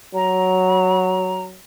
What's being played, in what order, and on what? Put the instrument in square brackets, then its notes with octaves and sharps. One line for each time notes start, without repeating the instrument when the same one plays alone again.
[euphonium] F#3 [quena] A#5